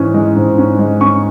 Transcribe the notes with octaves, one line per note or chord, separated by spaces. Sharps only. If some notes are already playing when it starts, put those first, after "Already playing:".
Already playing: G#2 E3 C#4
G#3
G#2
C#4
G#3
C#4 C#6